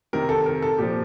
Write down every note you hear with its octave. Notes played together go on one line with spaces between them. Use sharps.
C3 D#3 A#4
A4
A#4
A4
A#2 F3 G4